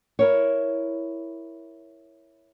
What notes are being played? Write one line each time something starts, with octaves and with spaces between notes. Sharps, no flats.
E4 A#4 C#5